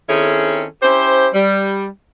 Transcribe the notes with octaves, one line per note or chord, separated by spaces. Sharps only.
D#3 C4 C#4 E4 G#4 A4
C#4 E4 G4 C5
G3